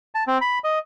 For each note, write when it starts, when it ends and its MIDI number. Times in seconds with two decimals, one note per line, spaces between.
0.15 0.24 81
0.27 0.38 60
0.41 0.59 83
0.64 0.79 75